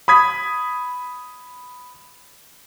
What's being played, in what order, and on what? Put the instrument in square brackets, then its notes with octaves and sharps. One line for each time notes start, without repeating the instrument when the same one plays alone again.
[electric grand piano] B5 D#6 G#6 B6